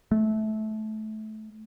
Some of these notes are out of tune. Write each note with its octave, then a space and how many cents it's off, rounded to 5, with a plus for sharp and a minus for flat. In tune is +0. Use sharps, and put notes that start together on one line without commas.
A3 -20